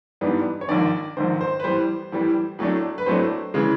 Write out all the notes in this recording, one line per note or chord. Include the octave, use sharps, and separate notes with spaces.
G#2 E3 G3 B3 D4
C#5
A#1 G#2 D#3 D5
A#1 G#2 D#3 C5
C5
B4
A2 E3 G3 C5
A2 E3 G3
A2 F#3 A3 D4
B4
A2 F#3 A3 D4 C5
C#3 E3 G#3